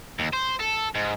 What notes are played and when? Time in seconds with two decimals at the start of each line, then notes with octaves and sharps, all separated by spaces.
0.19 D#2
0.33 C5
0.59 A4
0.95 G#2